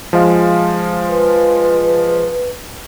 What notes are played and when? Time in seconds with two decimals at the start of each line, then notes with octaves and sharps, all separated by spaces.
0.13 F3 G#3 F5
1.08 B4